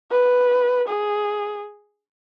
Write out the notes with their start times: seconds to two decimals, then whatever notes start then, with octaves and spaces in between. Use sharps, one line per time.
0.11 B4
0.88 G#4